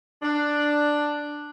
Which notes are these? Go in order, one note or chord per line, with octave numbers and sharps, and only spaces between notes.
D4